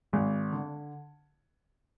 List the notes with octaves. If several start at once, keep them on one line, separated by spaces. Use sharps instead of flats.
G#1 G#3
D3